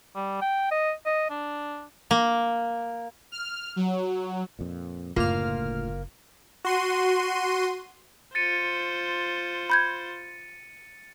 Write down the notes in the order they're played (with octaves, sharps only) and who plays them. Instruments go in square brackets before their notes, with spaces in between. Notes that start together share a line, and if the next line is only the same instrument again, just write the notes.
[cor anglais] G3
G5
D#5
D#5
D4
[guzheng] A#3
[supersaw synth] F6
F#3
[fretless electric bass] F2 A#2
[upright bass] F#1 [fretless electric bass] D2 A2 A3 [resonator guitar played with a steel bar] A#3 [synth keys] F4 F6
[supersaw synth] F#4 C6 D#7
[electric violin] F4 C5 [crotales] A6 C#7 D#7
[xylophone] B5 G6 G#6